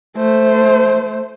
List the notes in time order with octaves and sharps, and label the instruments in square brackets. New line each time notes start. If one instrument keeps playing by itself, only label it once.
[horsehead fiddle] A3 C5